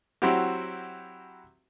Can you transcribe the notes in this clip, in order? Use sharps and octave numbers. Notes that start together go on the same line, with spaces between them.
F#3 C4 E4 F#4 G4